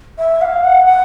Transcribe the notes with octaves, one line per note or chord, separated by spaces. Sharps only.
E5
F#5
F5
F#5
F#5